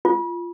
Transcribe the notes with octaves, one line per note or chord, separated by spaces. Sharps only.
F4